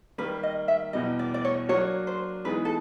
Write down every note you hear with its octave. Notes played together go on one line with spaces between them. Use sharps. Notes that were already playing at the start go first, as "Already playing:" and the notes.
D#3 G3 A#3 B4
D#5
E5
E2 B2 G3 D#5
D5
D5
C#5
F#3 A#3 D4 F#4 C#5
C5
E3 G#3 B3 D#4 G#4 B4
A4